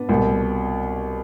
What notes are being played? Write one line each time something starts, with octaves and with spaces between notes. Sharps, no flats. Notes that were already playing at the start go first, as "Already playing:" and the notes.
Already playing: B3 D4
C2 B2